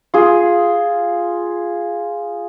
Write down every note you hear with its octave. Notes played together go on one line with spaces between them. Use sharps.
F4 G#4